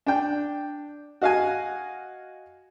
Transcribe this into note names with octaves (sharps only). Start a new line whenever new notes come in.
D4 G5
F#4 D#5 F5 F#5 G#5